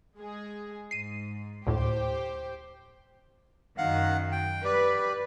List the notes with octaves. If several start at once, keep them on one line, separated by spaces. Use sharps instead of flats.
G#3 G#4
G#2 C7 D#7
D2 A2 G4 C5 G5
F#2 D#3 F5 F#5 F#6
G5
G4 B4 D5